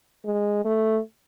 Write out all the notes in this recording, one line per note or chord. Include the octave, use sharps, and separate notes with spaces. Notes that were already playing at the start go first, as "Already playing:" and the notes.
G#3
A3